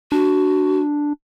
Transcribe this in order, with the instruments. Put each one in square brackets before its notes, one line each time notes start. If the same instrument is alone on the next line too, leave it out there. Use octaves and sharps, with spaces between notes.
[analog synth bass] D4 [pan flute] F#4